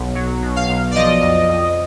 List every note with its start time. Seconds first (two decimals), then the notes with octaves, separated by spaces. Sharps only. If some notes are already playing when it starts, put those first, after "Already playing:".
Already playing: B1
0.15 F#3
0.42 B2
0.56 F5
0.69 B1
0.91 D5
0.95 F3 D#5
1.22 F2
1.49 F2